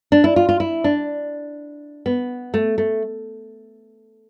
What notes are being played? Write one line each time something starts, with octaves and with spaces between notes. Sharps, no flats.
D4
E4
F4
F4
E4
D4
B3
A3
A3